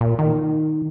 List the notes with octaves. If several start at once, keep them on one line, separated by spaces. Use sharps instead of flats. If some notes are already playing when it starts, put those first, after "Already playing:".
A#2
D#3